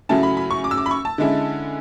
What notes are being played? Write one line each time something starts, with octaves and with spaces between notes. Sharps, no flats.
C#3 F#3 A3 C#4 E4 A5
B5
B5
C#6
D6
E6
D6
B5
C#6
A5
D3 G#3 C#4 E4